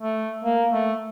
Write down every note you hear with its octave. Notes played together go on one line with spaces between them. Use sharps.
A3
A#3
A3